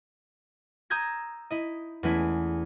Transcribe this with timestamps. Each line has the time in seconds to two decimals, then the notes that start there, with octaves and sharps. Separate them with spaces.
0.90 A#5 D#6 E6 G6 G#6 A#6
1.50 E4 D#5
2.03 E2 G#3 A3 C#4 E4